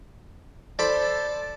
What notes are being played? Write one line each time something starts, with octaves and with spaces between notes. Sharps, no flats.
A4 C5 D5 A5 B5